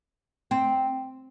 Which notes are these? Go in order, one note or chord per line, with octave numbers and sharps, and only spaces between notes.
C4